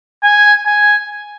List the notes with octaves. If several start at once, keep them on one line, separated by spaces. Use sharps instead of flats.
G#5
G#5